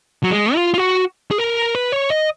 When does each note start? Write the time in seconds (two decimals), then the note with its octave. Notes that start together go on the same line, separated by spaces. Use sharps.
0.23 F#3
0.31 G#3
0.55 F4
0.74 F4
0.78 F#4
1.31 G#4
1.38 A#4
1.75 B4
1.92 C#5
2.10 D#5